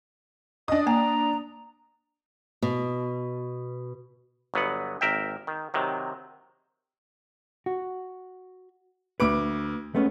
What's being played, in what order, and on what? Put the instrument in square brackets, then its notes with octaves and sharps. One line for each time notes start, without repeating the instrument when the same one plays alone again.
[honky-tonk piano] D4 D#6 [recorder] D#5
[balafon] A#3 G#5 [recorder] A#5
[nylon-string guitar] B2
[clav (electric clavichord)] G1 F#3 B3 F#5
G#1 A#4 E5 G5
D#3
C3 D#3 F#3
[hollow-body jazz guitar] F#4
[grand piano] D2 D6 D7 [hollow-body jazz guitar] B4
[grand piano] G#3 [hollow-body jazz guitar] A3 B3 C#4